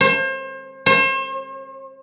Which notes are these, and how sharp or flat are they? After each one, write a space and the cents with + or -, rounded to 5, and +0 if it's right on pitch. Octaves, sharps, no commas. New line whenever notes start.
C5 +35
C5 +40